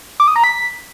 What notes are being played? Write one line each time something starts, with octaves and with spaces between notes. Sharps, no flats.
D6
D#6
A#5
B6